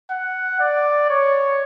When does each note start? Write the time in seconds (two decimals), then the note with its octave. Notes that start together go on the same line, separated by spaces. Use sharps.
0.11 F#5
0.60 D5
1.10 C#5